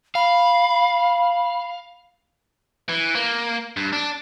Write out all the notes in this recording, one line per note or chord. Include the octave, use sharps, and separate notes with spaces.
F5 B5
E3
A#3
G2
D4